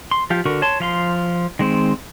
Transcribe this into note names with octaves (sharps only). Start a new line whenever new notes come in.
C6
F3 F4 G4
D3 F#4 A#4
C#5 A5 C6
F3 F5 C6
D#3 G#3 C4